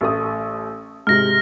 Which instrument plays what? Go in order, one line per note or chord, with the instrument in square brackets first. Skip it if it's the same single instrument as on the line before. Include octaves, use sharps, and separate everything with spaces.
[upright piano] A1 A3 D#6
[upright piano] G#2 C3 [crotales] F6 A#6